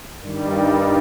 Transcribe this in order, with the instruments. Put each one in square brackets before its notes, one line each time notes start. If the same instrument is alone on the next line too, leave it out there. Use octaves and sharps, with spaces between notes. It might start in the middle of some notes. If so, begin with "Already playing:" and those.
[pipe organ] G2 D#3 G3